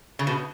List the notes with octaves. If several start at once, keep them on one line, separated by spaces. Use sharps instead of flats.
C#3
B2